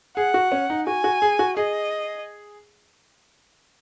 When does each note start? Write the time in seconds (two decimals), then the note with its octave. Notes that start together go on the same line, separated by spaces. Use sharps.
0.17 G#4 F#5
0.34 F#4
0.52 C#4
0.70 D#4
0.87 F#4 G#5
1.04 F#4
1.22 G#4
1.39 F#4
1.57 G#4 D#5